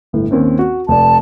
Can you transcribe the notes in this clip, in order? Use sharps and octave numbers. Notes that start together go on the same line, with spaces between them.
G1 A2
D#2 C4 C#4
F#4
F1 D5 A5